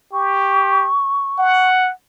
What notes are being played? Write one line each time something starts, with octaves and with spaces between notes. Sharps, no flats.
G4 C#6
F#5